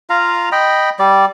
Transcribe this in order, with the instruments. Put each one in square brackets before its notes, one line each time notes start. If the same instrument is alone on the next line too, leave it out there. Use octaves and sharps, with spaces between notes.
[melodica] F4 F5 A#5
D#5 G5 B5
G3 D5